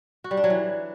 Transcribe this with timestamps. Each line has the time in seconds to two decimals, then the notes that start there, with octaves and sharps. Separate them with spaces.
0.24 F#4
0.31 G3
0.37 D4
0.44 F#3
0.50 E3